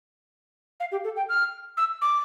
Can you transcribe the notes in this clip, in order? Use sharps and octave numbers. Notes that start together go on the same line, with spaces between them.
F5
G4
A4
G5
F6
E6
D6